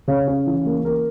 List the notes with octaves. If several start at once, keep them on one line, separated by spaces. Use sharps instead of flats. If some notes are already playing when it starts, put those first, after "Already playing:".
C#3 C#5 F5
C#4
E3
A#3
A#3 A#4